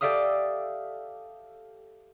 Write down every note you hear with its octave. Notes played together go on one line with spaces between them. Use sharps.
G4 A4 D5 E5 F5 D#6